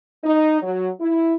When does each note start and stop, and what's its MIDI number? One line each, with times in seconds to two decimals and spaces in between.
0.24 0.62 63
0.62 0.89 54
1.00 1.36 64